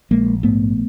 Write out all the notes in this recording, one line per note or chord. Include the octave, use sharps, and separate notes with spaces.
A#1 G#3 A#3
G#2 A3 B3